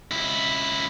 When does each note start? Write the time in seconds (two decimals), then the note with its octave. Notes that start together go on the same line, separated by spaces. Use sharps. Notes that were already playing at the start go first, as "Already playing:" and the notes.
0.11 C#2 E4